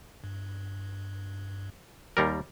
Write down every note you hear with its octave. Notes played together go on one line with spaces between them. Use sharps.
G2
D#2 G3 A#4